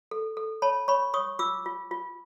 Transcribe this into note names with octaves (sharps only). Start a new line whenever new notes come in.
A4
A4
C#5 A5 B5
C#5 B5 C#6
C#5 C#6 D#6
F4 D6 E6
F4
F4